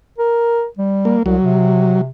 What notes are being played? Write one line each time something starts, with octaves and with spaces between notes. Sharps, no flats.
A#4
G3
A#3
C2 F#3
C3